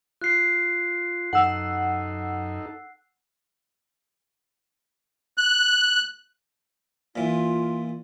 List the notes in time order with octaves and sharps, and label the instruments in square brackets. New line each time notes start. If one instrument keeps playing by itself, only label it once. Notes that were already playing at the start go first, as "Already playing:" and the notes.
[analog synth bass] F4 [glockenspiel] F#6 C7
[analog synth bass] F#2 [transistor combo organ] D#4 A4 [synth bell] F#5 E6
[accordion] F#6
[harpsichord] A#2 E3 [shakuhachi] F4